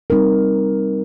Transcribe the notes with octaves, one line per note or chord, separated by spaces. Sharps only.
G3 C4 D#4 A#4